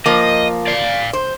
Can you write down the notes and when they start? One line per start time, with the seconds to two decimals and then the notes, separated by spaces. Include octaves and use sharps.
0.06 F3 A#3 D#5
0.68 D5 F5
1.13 C5